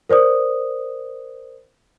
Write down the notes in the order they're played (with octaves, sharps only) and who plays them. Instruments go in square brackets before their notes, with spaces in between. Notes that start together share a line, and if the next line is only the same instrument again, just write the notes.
[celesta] A#4 C5 D5 D#6